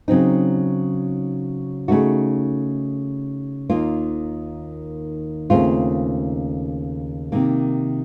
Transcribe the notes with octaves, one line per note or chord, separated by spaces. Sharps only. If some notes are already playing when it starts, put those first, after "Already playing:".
C#3 F#3 C4 D#4
C#3 A3 D#4 F#4
D#2 D#3 A#3 F4
D#2 C#3 A3 C4 F4
C3 D#3 A#3